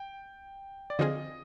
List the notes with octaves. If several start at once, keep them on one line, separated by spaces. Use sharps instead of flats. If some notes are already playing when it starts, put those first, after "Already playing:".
Already playing: G5
D5
D3 F3 C4 F4 G#4 D#5